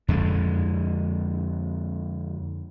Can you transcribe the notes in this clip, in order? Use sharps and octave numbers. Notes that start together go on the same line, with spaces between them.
F2 D3 G#3